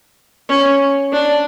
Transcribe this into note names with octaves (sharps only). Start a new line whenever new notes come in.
C#4
D4